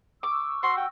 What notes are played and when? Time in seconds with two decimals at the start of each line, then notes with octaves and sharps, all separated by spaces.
0.23 C#6 D6 E6
0.63 F#4 C6
0.77 G5